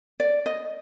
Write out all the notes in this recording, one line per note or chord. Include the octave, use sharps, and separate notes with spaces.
D5
D#5